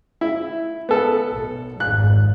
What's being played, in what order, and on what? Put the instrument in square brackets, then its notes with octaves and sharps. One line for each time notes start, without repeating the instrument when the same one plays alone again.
[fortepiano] E4
B3 A4
[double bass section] B1
[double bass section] G#1 F2 [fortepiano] F#6